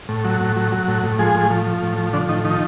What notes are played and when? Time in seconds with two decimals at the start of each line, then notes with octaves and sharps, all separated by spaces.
0.09 A2
0.24 F#3
0.41 A2
0.56 F#3
0.72 F#3
0.88 A2
1.03 A2
1.19 F3 G#3 G#4
1.35 A2
1.50 F3
1.66 F3
1.82 A2
1.98 F3
2.13 D3 F3 D4
2.29 A2 D#3 D#4
2.44 D#3 F3 D#4